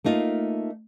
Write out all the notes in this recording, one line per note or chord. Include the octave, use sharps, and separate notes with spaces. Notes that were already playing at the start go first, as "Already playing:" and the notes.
A3 A#3 D#4 F4